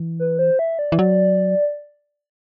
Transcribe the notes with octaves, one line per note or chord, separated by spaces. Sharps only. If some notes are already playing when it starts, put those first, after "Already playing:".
Already playing: E3
B4
C5
E5
D5
E3
F#3 D5